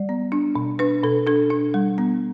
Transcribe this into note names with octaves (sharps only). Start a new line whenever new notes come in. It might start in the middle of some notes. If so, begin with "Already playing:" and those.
Already playing: G3 D5
B3
D4
B2
D4 B4
B2 A4
D4 A4
D4
G3
B3